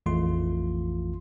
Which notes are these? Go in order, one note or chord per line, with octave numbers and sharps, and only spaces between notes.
A#1 F2 E3 A3 F4 C6